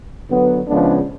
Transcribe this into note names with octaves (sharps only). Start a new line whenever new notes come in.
D3 F#3 B3
C#3 F3 G#3 B3 D4